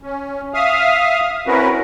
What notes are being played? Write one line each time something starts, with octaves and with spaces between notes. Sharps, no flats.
C#4
E5 F5 D#6 F6
C4 C#4 E4 F#4 A#4 B4